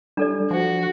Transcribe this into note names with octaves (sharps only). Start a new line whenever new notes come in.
G3 D4 A4 D5
F3 F#4 G#5